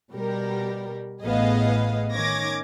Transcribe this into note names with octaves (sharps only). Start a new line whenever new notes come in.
B2 G3 G4 A#4
A1 A2 B3 G#4 D#5 F5
D#3 C#4 D6 G#6 A#6